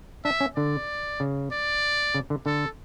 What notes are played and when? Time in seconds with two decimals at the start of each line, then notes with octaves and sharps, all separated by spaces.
0.25 D4 E5
0.40 C#4
0.57 D3 D5
1.20 C#3
1.52 D5
2.15 C#3
2.30 D3
2.46 D3 A4